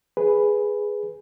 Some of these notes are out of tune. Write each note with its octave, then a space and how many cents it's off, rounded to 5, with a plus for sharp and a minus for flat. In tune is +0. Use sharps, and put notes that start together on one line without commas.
G#4 +0 B4 +0